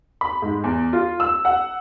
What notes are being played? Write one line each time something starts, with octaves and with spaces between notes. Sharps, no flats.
B5
G#2
E2
F4
E6
F#5